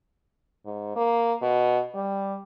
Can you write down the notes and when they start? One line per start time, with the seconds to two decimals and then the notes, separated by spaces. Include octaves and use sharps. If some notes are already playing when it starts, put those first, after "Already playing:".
0.66 G#2
0.96 A#3
1.42 B2
1.94 G3